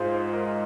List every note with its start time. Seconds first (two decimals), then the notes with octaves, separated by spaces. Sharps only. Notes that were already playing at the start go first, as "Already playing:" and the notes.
Already playing: G#2 G#3 F4 G#4 C5
0.33 A#4 D#5